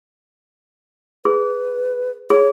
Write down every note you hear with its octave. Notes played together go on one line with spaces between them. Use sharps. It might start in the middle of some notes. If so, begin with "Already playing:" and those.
G#4 B4
G#4 C#5